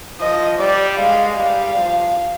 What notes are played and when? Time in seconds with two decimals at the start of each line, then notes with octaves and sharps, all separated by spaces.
0.20 F3 D#5
0.59 G3 D5
0.98 G#3 F5
1.37 G3 F5
1.76 F3